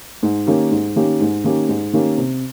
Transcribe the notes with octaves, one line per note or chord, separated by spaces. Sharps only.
G#2
D#3 A#3 C#4 G4
G#2
D#3 A#3 C#4 G4
G#2
D#3 A#3 C#4 G4
G#2
D#3 A#3 C#4 G4
C3